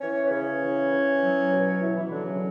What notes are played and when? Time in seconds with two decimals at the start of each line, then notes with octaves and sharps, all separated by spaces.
0.01 E3 C#4 C#5
0.26 B4
0.30 C#3 C#4 C#5
0.61 E3
0.91 E3
1.20 F#3
1.50 B2
1.80 B2 E3 E4
1.95 E3 E4
2.10 D3 F#3 D4
2.25 C#3 C#4